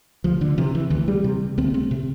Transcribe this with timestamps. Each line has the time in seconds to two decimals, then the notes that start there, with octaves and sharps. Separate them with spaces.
0.24 D2 F3
0.41 D3
0.58 C3 E3
0.75 E3
0.90 D2 E3
1.08 G3
1.24 C3
1.58 D2 C4
1.74 C4
1.91 C3